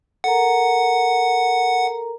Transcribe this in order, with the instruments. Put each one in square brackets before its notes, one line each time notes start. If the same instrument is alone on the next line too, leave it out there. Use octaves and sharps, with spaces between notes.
[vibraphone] A4 A#4 A#5 [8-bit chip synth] F#5